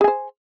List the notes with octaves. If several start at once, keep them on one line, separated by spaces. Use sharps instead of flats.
G#4 C5 G#5